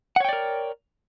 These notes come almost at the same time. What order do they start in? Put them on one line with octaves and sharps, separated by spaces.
F#5 C#5 G5 D5 A#4